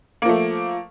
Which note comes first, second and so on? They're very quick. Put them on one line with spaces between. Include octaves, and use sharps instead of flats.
A#3 F3 A3